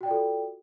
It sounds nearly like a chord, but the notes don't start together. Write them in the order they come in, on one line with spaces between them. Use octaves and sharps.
F#4 G5 D5 F4 A4